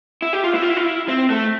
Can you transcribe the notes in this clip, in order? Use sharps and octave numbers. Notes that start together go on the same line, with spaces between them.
E4
G4
F4
E4
F4
E4
F4
E4
C4
A3